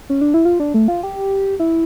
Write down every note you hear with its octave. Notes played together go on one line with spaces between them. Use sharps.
C#4
D4
E4
F4
D4
A3
F4
G4
E4